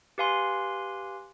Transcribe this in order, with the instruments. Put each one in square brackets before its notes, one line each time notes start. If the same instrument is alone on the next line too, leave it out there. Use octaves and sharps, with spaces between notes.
[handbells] G4 B4 F5 G#5 C6